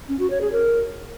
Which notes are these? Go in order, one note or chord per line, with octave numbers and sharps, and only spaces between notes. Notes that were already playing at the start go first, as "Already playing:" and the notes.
C#4
F#4
C#5
G#4
A#4